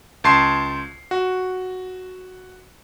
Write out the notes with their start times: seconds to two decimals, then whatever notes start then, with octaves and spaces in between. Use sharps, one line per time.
0.24 C#2 A5 C6 C7
1.11 F#4